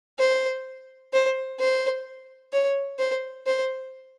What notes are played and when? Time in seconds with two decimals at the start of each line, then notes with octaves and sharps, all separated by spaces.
0.19 C5
1.13 C5
1.60 C5
2.53 C#5
2.99 C5
3.46 C5